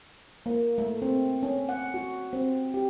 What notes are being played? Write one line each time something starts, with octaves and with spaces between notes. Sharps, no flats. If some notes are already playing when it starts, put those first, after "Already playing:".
A#3
A3
C4
C#4
F#5
F#4
C4
G4